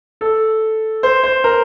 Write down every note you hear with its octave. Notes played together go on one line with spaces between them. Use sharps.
A4
C5
C5
A#4